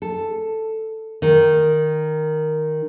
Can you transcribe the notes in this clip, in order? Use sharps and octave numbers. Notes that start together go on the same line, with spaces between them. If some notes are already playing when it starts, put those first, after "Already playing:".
A4
D#3